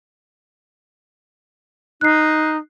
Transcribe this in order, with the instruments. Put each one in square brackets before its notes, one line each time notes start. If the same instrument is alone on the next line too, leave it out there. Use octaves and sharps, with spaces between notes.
[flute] D#4 [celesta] F#6 C7